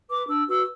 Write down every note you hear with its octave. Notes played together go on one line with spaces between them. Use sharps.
B4 D6
D4 E6
F#4 B4 E6